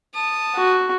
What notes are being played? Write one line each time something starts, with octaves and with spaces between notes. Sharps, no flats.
A5 D#6
F#4